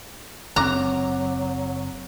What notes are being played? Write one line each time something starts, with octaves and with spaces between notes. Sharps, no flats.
F#1 F#3 C4 A#5 D6 F#6